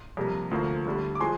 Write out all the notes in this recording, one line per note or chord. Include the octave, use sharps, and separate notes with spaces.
F2 C3 G3 A#3
D2 D3 F3 A#3
D2 D3 G3
D6
F3 G#3 G#5 C6